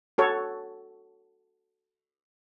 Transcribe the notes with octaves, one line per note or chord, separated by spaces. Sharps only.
F#4 A4 C#5